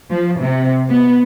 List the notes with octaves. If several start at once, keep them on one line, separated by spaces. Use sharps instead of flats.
F3
C3
B3